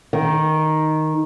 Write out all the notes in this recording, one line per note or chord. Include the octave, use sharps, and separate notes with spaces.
D#3